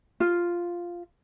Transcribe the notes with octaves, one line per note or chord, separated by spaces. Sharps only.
F4